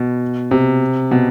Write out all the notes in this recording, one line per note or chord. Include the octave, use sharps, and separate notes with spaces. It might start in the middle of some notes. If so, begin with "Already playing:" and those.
Already playing: B2
C3
B2